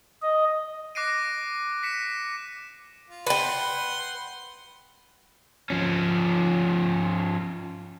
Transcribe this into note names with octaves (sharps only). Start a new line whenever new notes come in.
D#5
D6 F#6 A#6 C7 D7 D#7
B6 C#7 E7
F4
B4 F#5 G5 C6
F3 C#4